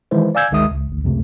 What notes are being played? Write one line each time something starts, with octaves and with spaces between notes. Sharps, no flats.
D#3 E3 G#3 E4 B4 C5
D5 F5 G#5 E6 G6 G#6
G1 D2 D#3 G#3 E5 D#6
C#2
G#1 D2
C#2 F#2 C3 A3